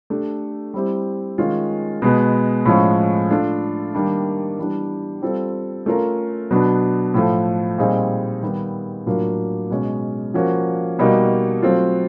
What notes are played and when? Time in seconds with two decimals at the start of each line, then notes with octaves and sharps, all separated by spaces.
0.10 A3 D4 G4
0.74 G3 C4 E4 G4
1.38 D#3 G#3 C#4 F4
2.02 B2 G#3 B3
2.66 A2 F3 G#3 C#4
3.30 A3 D4 F4
3.94 D#3 G3 A#3 D4
4.58 E3 G3 B3 D4
5.22 G3 C4 F4 A4
5.86 A3 C#4 F4 A#4
6.51 B2 F#3 B3 D4
7.14 A2 F3 A3
7.78 A#2 G3 C4 D#4 G#4
8.42 D#3 G3 B3
9.06 A2 F#3 A#3 D4 F4
9.70 B2 G#3 C#4
10.34 F3 A#3 C#4 F#4
10.99 B2 G3 A#3 D#4 F#4
11.62 F#3 A3 C4 F4